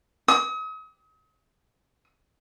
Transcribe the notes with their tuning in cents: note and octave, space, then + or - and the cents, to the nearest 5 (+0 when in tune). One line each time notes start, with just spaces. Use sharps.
D#6 +40